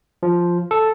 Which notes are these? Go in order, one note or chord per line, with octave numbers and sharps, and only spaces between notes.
F3
A4